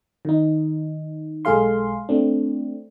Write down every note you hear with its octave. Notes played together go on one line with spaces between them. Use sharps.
D#3 D#4
B1 G#3 G#4 A4 F5 C6
A3 C4 D4